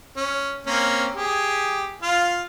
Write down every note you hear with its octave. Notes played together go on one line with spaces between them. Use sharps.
C#4
A#3 C4 C#4
G4 G#4
F4 F5